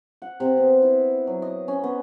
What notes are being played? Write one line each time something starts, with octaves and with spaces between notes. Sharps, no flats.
F#5
C3
B3
E4
F#3
D#5
C#4
B3